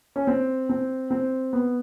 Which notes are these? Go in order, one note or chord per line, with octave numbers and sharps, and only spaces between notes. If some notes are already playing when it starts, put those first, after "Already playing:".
C#4
C4
C4
C4
B3